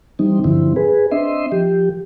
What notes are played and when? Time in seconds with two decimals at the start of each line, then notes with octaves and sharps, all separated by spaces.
0.19 E3 G3 C4 D#4
0.44 G2 D3 F3 C4 E4
0.76 G#4 B4
1.11 C4 D4 D#5 E5 C6
1.52 F3 G4